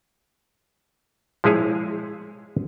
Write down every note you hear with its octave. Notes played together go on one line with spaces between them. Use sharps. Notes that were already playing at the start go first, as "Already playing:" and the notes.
F3 G#3 E4 G#4 C#5